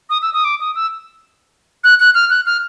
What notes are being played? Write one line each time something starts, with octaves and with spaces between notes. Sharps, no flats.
D#6
E6
D#6
D6
D#6
E6
F#6
F#6
F6
F#6
F6